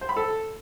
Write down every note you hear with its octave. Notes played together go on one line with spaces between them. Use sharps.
C5
B5
A4